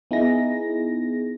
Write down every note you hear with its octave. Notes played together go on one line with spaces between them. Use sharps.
B3 D#4 E4 G#4 A#6